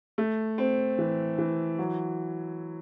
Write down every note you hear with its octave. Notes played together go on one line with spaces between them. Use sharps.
A3
C4
E3
E3
F#3